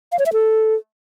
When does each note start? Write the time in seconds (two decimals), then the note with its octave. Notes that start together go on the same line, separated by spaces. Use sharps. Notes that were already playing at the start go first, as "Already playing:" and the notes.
0.12 F5
0.19 C#5
0.26 E5
0.33 A4